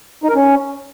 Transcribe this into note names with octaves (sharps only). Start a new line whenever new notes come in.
D#4
A#4
C#4